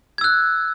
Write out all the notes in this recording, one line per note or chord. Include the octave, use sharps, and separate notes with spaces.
E6 F#6 G#6